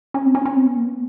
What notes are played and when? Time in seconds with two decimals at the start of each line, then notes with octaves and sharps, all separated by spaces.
0.14 C#4
0.25 C4
0.35 C#4
0.45 C#4
0.56 C4
0.65 B3
0.76 A#3
0.86 B3